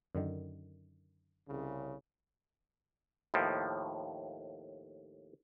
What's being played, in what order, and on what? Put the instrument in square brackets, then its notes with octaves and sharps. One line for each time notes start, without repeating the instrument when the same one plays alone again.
[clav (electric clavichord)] F#2 D3 D#3
[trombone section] C2 C#3
[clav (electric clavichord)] D#2 A2 F3